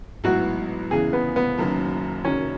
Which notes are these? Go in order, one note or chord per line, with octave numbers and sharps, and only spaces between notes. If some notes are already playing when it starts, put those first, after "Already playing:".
A1 G#2 F#3 B3 E4 F#4
E2 C#3 E3 G#4
B3
B3
F#1 F#2 D#3 F#3 C#4
F#2 D#3 F#3 C#4